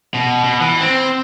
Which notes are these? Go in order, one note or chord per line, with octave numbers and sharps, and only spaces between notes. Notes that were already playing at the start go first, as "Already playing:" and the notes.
B2
B2
E3
C4